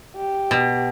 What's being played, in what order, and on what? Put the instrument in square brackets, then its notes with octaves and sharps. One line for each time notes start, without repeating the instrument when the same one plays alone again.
[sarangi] G4
[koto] B2